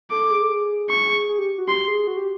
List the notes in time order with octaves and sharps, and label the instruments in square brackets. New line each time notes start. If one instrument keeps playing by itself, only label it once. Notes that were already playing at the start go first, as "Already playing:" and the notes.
[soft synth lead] A4 [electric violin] D6
[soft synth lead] G#4
A4
G#4
[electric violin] C#6
[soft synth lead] G#4
G4
F#4
[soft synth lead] G4 [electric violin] C6
[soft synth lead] G#4
F#4
G4